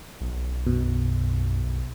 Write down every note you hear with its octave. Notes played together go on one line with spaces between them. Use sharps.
B1
F#2 B2